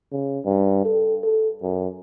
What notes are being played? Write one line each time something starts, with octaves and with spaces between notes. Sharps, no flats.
C#3
G2
A4
A4
F#2